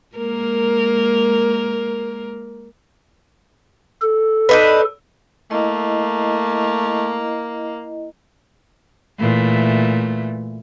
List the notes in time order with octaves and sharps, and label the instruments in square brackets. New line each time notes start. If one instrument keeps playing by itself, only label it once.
[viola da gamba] G#3 A#3 A#4
[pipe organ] A4
[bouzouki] D4 D#4 B4
[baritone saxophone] A3 [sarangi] A#3 [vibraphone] E4 D#5
[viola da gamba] A#2 E3 A3